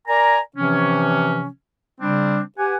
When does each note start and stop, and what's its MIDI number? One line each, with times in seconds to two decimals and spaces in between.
0.08 0.39 70
0.08 0.39 74
0.08 0.39 80
0.08 0.39 82
0.56 1.47 48
0.56 1.47 52
0.56 1.47 53
0.56 1.47 60
0.56 1.47 61
2.01 2.41 49
2.01 2.41 55
2.01 2.41 60
2.01 2.41 62
2.58 2.77 67
2.58 2.77 71
2.58 2.77 78
2.58 2.77 80